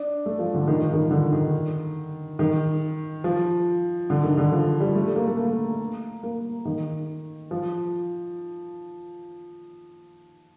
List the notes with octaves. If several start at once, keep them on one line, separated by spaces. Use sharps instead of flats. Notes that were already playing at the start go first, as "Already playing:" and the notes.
Already playing: D4
A3
F3
D3
D#3
F3
D#3
D3
D#3
D#3
F3
D3
D#3
D3
F3
G3
A3
A#3
A3
A#3
A#3
D#3
F3